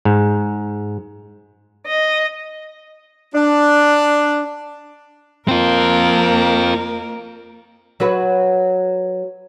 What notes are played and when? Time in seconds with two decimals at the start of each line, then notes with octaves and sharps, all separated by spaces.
0.05 G#2
1.87 D#5
3.35 D4
5.48 A#3 C4 F4 A#4
8.00 F#3 F#4 B4